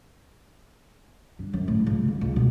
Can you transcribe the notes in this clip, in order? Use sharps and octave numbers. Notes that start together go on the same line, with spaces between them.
G2
F#2
A2
C#2
A1
C#2
B2